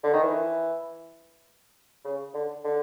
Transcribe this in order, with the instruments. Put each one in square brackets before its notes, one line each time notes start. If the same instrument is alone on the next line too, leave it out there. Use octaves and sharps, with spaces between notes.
[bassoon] D3
D#3
E3
C#3
D3
D3